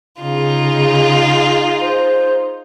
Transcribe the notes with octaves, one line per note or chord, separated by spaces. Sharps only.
C#3 D#4 F4 G#4
C5